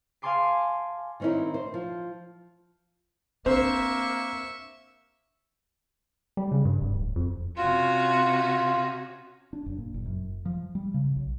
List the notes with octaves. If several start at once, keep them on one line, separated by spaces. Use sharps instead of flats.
F5 G#5 A5 C6 D6 C7
D#3 C4 C#4 D#4 E4
C5
F3
A#3 C4 D4 C5 E5 C#6
G3
C#3
G2
F1
D1
F2
C3 C#4 F4 F#4
D4
F#1
A#2
F#1
F#2
F3
G3
C#3
B1